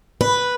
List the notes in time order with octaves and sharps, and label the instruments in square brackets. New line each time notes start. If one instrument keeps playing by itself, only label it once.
[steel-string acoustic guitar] B4